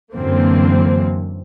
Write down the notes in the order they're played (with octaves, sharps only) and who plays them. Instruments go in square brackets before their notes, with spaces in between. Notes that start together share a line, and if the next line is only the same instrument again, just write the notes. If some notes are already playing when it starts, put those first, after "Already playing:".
[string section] F#2 D3 E3 A#3 C4